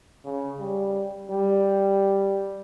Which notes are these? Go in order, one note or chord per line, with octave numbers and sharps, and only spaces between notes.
C#3
G3
G3